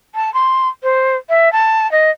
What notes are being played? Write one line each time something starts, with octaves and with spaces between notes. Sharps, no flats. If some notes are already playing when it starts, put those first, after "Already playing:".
A5
C6
C5
E5
A5
D#5